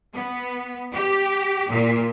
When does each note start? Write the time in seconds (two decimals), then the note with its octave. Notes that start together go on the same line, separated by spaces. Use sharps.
0.14 B3
0.93 G4
1.70 A#2